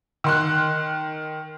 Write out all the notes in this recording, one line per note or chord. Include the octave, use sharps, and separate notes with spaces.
D#3 C6 F#6